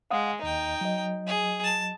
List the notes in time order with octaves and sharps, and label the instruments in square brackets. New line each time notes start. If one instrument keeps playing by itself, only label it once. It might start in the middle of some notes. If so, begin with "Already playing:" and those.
[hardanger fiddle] G#3 [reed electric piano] F5 F#5 D#6
[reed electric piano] D#2 D#5 [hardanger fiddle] D#4 G5
[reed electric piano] F#3 D#5
[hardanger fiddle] G#4
A5